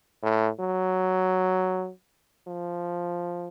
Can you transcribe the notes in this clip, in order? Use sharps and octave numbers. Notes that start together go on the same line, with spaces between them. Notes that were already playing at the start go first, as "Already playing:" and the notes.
A2
F#3
F3